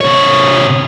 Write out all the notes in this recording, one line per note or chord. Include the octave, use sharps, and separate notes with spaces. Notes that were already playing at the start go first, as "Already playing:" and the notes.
C3 C#5